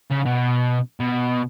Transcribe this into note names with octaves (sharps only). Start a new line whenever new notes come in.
C#3
B2
B2